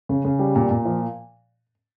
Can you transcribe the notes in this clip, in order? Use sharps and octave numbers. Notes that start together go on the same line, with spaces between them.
C#3
C#3
G3
A#2
A#2
F3